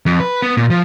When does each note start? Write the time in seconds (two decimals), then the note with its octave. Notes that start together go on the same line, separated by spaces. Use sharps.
0.06 F2
0.20 B4
0.42 B3
0.57 A#2
0.70 F3